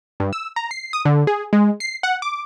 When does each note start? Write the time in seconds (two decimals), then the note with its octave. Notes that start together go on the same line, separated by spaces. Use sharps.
0.20 G2
0.33 E6
0.56 A#5
0.71 C7
0.93 D#6
1.05 D3
1.27 G#4
1.53 G#3
1.80 C7
2.03 F#5
2.22 D6